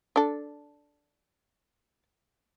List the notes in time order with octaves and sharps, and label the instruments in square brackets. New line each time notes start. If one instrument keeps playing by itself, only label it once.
[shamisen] D4 A4